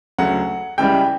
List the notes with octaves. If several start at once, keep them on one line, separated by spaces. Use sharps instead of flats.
D2 C#3 F#3 F#5
C#2 C#3 E3 G3 G5